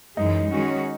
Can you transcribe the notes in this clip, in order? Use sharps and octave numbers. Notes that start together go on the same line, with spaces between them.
F#2 E3 G#3 D#4
D#3 G#3 C#4 F#4